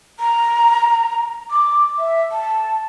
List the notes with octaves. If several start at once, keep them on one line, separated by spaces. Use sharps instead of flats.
A#5
D6
E5
A5